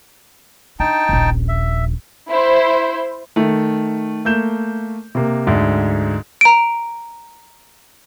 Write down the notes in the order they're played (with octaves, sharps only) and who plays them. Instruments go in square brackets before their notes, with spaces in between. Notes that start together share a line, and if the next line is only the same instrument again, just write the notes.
[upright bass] D4 [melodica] D#4 G5 A5
[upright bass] D#1 A#1
[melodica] E5
[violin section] E4 C5
[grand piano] D#3 A3
A3 A#3 G6 E7
C3 A#3
D2 G#2 D3
[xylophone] A#5 D7